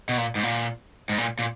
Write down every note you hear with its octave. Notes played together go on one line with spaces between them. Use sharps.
B2
A#2
G#2
A#2
G#2
A#2
A#2